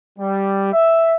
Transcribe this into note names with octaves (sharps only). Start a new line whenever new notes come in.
G3
E5